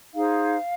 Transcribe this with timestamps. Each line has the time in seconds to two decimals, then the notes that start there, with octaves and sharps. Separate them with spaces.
0.14 D#4 G#4 C5 F5